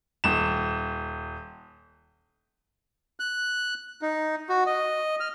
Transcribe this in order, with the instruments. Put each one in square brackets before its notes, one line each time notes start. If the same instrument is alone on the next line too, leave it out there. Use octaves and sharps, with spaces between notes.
[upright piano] D#1 E7
[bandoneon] F#6
D#4
F#4
D#5
F6